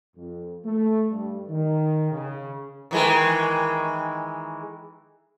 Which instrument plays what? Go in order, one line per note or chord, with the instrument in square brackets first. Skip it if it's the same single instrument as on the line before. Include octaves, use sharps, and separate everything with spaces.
[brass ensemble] F2
A3
G2
D#3
C#3
[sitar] D#3 E3 G#3